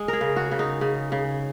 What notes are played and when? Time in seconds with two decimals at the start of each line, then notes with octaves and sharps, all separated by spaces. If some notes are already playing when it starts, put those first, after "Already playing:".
Already playing: G#3
0.08 G#4 A#4
0.21 C#3
0.36 F#4
0.51 C#3
0.59 D#4
0.81 C#3
1.12 C#3